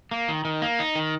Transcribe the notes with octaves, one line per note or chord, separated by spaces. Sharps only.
A#3
D#3
D#3
A#3
D#4
D#3